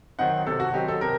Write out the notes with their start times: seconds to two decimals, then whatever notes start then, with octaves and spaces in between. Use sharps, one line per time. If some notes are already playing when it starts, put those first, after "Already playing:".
0.19 D#3 F#3 C4 D#4 F#5
0.47 C3 A4
0.60 F#4
0.73 D#3 F#3 C4 D#4 G4
0.88 A4
1.01 C3 A#4